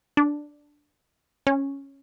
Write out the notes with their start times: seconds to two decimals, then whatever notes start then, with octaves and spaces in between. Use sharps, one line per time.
0.17 D4
1.47 C#4